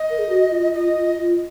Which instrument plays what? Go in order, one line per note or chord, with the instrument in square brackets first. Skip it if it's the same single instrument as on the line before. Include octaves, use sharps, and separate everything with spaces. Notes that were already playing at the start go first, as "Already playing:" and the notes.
Already playing: [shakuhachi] D#5
[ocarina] A#4
G#4
F#4
F4
[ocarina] F4 [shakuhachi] D#5
[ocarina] F4
F4